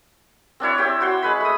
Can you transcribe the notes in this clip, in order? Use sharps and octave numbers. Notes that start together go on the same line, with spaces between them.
C4 D4 E4 C#5
C4 G4 E5 G5
F#4 C#5 C6
G#3 B4 B5
A3 D#6